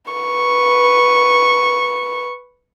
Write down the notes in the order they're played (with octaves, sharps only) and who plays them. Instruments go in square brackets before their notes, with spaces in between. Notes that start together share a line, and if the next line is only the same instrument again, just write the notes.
[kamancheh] B4 C#6